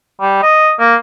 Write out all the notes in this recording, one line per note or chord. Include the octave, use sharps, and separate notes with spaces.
G3
D#5
A#3